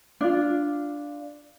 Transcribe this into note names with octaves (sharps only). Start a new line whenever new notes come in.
D4 F4